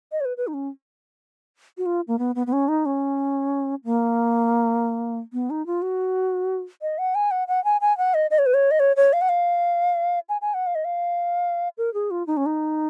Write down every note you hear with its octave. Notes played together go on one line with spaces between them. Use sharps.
D#5
C#5
B4
B4
D#4
C#4
F#4
F4
A#3
B3
B3
B3
C#4
D#4
C#4
A#3
B3
D#4
F4
F#4
D#5
F#5
G#5
F#5
F#5
G#5
G#5
F#5
D#5
D#5
C#5
B4
C#5
D#5
C#5
C#5
F5
F#5
F5
G#5
G#5
F#5
F5
D#5
F5
A#4
G#4
F4
D#4
C#4
D#4